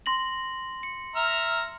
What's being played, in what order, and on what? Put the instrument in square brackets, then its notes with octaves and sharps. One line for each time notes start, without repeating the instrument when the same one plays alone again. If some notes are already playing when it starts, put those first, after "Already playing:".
[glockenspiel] C6 A#6 F#7
C#7
[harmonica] E5 A#5 F6